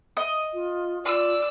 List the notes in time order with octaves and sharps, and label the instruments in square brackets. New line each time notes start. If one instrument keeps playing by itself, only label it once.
[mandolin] D#5
[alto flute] F4
[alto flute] F4 [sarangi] D5 [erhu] E6